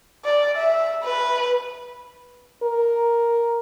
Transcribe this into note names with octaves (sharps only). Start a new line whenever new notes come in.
D5
E5
B4
A#4